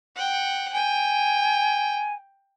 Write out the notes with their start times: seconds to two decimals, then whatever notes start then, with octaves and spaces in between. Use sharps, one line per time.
0.16 F#5 G5
0.73 G5 G#5